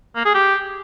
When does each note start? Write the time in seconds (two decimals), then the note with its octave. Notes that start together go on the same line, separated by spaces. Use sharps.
0.16 A#3
0.25 G#4
0.35 G4